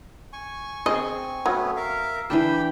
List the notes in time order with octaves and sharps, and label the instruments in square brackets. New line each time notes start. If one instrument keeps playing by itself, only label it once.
[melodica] G#5 C#6
[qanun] C4 [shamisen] G#4 D#5
[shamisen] F#3 [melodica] A3 B3 C#4
[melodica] A#4 E5 F5
[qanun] E3 D4 A5 [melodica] G4 G5 B5